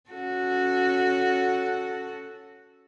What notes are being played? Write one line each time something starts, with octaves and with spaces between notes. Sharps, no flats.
C#4 F#4 A4